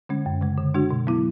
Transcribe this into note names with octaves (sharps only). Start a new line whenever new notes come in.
D3 G#3 C#4
F#2
C#3 G#3
D3
G#3 D4 F#4
B2
F#3 B3 E4